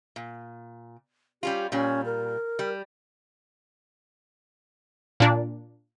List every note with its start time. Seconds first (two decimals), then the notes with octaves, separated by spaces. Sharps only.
0.16 A#2
1.43 G3 C#4 F4 G4
1.72 A#2 G3 C#4
2.05 A#4
2.59 G3
5.20 A#2 D4